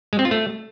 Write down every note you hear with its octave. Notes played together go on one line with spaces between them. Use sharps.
G#3
C4
F4
A3